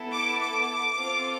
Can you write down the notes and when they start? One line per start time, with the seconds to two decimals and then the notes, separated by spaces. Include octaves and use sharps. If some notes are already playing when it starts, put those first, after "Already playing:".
Already playing: B3 E4 A4
0.14 D6
0.41 D6
0.97 C4 F4 A4